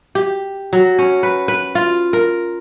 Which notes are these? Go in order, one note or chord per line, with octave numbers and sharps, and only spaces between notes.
G4
F#3
C#4
B4
B4
F4
A#4